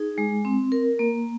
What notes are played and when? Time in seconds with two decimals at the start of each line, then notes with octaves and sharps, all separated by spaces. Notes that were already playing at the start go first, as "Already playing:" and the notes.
Already playing: D#4 G#4
0.18 G#3
0.45 C4
0.72 A#4
0.99 A#3